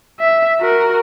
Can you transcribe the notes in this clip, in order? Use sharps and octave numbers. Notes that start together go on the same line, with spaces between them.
E5
F#4 A#4